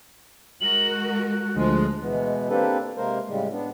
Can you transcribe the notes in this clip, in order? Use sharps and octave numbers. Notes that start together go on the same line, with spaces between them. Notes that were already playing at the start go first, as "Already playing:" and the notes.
G#3 F#4 A#4 F#7
F#6
D2 F3 G#3
B2 E3 G#3 B3
A#3 C4 D4 G4 A4 B4
C3 G#3 A#3 A#4 C5
A2 C#3 G3 G#3
B3 D4